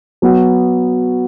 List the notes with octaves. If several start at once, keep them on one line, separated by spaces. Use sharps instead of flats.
F#3 B3 F#4